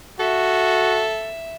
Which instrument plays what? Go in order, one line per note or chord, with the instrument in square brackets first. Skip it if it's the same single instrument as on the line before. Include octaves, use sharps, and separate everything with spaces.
[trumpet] F#4 [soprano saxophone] A4 [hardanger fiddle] E5